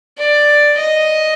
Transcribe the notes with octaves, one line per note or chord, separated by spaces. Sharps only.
D5
D#5